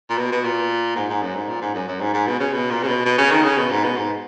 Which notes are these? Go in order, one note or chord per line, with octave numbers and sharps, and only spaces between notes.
A#2
B2
B2
A#2
G#2
G#2
F#2
G#2
A#2
G#2
F#2
F#2
G#2
G#2
B2
C#3
B2
A#2
C#3
B2
B2
C#3
D#3
C#3
B2
G#2
B2
G#2